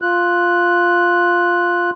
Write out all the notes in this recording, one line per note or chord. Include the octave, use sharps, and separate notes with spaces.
F4 F#6